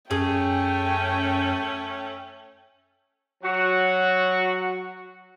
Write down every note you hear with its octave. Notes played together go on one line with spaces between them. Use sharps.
F#2 A3 C#4 G#4 G5
F#3 F#4